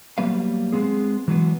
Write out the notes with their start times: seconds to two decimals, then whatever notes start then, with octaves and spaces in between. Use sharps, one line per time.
0.18 F#3 G3 A#3 B3 B4 F5
0.73 G#3 B3 C4 G#4
1.28 E3 F#3 G#3 B3